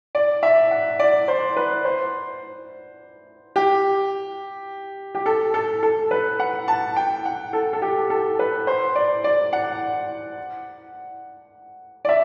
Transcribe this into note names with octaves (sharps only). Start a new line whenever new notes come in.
D5
E5
F#5
D5
C5
B4
C5
G4
G4
A4
A4
A4
B4
F#5
A5
G5
F#5
A4
A4
G4
A4
B4
C5
D5
D5
F#5
D5
E5